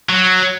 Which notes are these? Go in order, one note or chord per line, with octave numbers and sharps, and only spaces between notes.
F#3